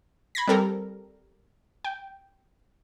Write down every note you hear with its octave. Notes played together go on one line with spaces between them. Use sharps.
B5 G#6 A#6
G3 C4 A4 A#4
G5